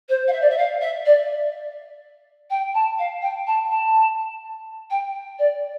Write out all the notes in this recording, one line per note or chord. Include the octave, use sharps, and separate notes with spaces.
C5
F5
E5
D5
E5
F5
E5
D5
G5
A5
F5
G5
A5
A5
G5
D5